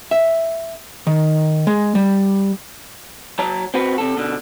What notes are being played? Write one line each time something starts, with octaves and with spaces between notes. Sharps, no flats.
E5
D#3
G#3
G3
F#3 C#5 A5 A#5
C4 F#4 B4
C3 A4
B2 D3